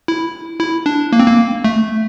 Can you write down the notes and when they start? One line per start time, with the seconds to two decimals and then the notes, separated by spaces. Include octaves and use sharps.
0.08 E4
0.60 E4
0.86 D4
1.13 A#3
1.20 C4
1.27 A#3
1.64 A3